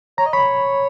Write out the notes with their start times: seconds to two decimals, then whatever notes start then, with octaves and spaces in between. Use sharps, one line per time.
0.17 C#5 A#5
0.26 D#5
0.33 C#5 B5